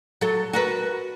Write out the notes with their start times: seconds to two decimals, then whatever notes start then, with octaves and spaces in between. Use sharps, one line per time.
0.21 F#3 A4
0.53 F#4 A#4 B4